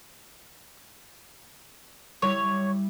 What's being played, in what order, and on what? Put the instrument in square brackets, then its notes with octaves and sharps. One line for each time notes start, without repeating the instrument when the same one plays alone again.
[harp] G3 E4 [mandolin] C#5